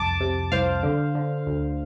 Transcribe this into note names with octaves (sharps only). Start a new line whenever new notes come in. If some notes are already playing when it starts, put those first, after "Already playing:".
Already playing: C2 F2 A5 D6
C3
C2 C5 F5
D3
D3
D2